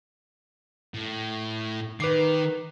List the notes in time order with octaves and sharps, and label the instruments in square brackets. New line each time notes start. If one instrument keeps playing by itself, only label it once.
[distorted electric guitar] A2
[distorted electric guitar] D#3 [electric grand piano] B4 D6 C7